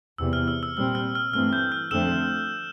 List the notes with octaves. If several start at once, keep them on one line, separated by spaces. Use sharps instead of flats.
E2 C3 E3 E6
F6
E6
E6
A#2 G3 C4 E6
F6
F6
G2 E3 A3 C4 F6
G6
F6
F2 D3 A3 C4 E6 E7